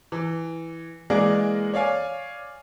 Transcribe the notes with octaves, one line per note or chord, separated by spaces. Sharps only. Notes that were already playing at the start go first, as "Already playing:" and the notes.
E3
E3 G#3 A#3 G#4 A#4 D5
C#5 D5 F5 G#5